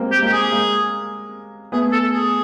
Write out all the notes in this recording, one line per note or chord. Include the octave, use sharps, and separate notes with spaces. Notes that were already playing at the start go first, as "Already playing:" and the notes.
Already playing: G3 G#3 A#3 C4
G4
G#3 A#3 G4
G#4
G#3 A#3
A3 B3 G#4
A4
G#4